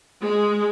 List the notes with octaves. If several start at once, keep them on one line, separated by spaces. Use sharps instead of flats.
G#3